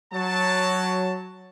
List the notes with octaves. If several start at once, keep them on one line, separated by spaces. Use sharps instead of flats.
F#3 A5